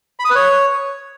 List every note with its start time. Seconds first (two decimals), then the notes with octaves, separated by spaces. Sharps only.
0.20 B5
0.25 D#6
0.30 B4
0.35 C#5